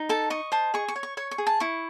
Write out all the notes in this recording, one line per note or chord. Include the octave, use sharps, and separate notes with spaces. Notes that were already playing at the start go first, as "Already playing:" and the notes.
Already playing: D#4
A4 A5
D#5 C#6
C5 A5
G#4 C#6
C#6
C#5
C#6
C#5 C#6
C#6
G#4
A5
E4 C#6